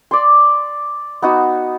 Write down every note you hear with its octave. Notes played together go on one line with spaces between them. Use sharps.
D5 C6
B3 D#4 F#4